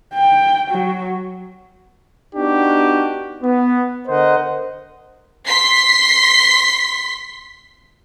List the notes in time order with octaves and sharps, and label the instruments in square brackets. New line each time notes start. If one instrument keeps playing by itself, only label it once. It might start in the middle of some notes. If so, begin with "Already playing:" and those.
[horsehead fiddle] G5
F#3
[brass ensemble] B3 D4 D#4 F#4 G4
B3
D3 A#4 C5 D#5 F#5
[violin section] C6 B6 C7